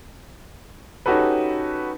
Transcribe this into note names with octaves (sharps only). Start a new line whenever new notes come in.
C#4 D#4 F#4 G4 A4 B4